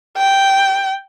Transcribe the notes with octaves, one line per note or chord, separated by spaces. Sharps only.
G5